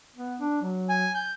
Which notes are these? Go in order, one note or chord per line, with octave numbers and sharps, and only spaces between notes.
B3
D4
F#3
G#5
G6